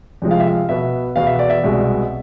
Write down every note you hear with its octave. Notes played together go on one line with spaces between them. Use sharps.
F2 C3 F3 G#3
F5
E5
F5
B2 B3 E5
E2 B2 B3 F5
E5
D5
E5
C2 B2 G#3